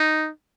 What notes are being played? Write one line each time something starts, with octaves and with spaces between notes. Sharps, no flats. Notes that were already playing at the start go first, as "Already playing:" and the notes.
Already playing: D#4